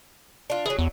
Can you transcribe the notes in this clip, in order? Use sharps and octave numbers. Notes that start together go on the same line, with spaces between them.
D4 F4
E3 F#3 G#4
E2